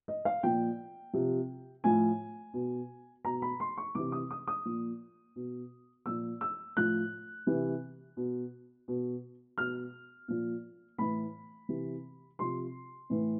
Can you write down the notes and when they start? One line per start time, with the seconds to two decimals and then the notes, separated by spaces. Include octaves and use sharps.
0.08 D#5
0.25 F5
0.43 A#2 F3 G5
1.13 C3 F3
1.84 A2 F3 G#5
2.54 B2
3.25 B2 A#5
3.42 B5
3.60 C6
3.77 C#6
3.95 C3 E3 D6
4.12 D#6
4.31 D#6
4.47 D#6
4.65 A#2 F3
5.36 B2
6.06 A#2 F3 E6
6.41 E6
6.77 A2 F3 F#6
7.47 C3 E3
8.17 B2
8.88 B2
9.58 B2 F6
10.28 A#2 F3
10.98 A2 E3 B5
11.69 C3 E3
12.39 C3 F3 C6
13.10 A2 E3